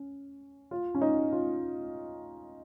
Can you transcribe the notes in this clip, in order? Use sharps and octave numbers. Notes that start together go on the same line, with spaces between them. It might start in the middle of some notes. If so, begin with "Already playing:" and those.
Already playing: C#4
F4
C#4
D#4
F4